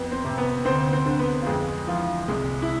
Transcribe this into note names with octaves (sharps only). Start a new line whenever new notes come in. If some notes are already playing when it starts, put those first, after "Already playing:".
Already playing: F2 B3 B4
C4 C5
C3
B3 B4
D2 C4 C5
C4 C5
D3
B3 B4
F4
F2 G#3 G#4
E3 F3 F4
C2 G#3 G#4
E4